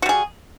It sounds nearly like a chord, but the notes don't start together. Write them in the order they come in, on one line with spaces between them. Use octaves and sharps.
F#4 G3 G#4